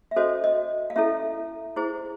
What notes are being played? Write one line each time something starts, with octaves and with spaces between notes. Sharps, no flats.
E5
C#4 F#4 A4 C5 D#5
D#5
F5
C#4 E4 A4 E5
E4 G#4 C5